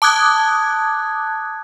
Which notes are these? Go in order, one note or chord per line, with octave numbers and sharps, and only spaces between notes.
A5 D6 D#6 F#6 G#6